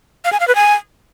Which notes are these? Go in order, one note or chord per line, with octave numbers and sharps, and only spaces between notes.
F5
G#5
F5
B4
G#5